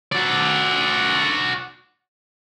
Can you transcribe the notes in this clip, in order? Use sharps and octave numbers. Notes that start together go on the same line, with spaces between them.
F#4 D5